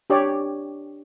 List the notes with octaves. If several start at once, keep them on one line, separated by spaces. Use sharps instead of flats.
D4 G4 C#5 D5